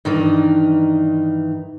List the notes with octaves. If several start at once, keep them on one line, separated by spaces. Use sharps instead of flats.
G2 D#3 E3 D#4